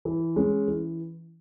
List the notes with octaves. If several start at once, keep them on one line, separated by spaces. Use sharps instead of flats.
E3
G#3 C#4
E3